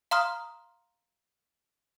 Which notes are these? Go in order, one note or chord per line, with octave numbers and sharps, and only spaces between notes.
F5 A#5 C6 D#6 F6